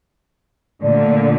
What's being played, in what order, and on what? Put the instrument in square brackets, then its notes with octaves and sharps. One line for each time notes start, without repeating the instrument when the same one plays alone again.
[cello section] A#2 D3 A3 [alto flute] D5